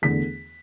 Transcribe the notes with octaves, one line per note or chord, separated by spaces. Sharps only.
E2 D3 A3 B6